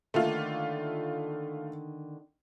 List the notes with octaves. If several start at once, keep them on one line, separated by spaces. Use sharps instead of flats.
D3 D#3 A3 A#3 F4